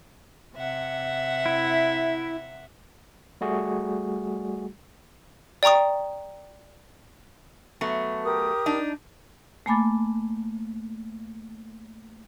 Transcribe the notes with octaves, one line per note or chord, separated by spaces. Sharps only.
C3 E5 F#5
E4
G3 A3 F#4 G#4
D5 G5 A#5 C#6 D#6
F#3 A3 B3
G4 A#4 D#6
D4 D#4
A3 A#3 G#5 B5 D6 A6